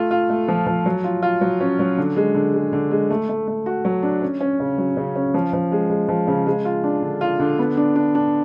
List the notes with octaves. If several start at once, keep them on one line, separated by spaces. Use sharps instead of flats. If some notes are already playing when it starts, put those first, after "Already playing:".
Already playing: A3 F4
F4
A3
F3
F3
F#3
F4
F4
F#3
C#4
F#3
D3
G#3
D3
G#3
D3
G#3
A3
A3
A3
F#4
F#3
D4
C#4
C#4
C#3
F#3
C#3
C#4
F3
F3
G#3
G#3
F3
C#3
G#3
F4
D4
D3
F4
D3
B3
D4
D4
D4